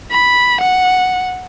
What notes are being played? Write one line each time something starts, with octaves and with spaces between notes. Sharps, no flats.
B5
F#5